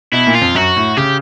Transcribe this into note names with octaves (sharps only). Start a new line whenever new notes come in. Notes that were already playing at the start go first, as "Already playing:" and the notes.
B2 E4
A#2
F4
F2
F#2 F#4
A2
C#3 G4